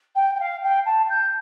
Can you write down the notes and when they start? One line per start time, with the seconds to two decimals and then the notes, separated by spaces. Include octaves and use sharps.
0.15 G5
0.35 G5
0.40 F5
0.63 G5
0.85 A5
1.10 G6